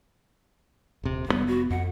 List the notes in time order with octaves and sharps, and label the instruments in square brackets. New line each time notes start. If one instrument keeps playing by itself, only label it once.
[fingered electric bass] D#1 C3
[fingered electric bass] F1 C#3 B3 [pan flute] G3
[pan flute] F#4
[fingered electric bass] F2 [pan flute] F#5